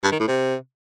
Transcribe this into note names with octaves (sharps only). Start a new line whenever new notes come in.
G2
D#3
A2
C3